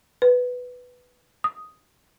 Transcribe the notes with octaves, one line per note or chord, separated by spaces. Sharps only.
B4
D#6